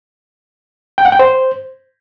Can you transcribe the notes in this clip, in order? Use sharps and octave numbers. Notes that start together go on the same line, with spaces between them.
G5
F#5
G5
C5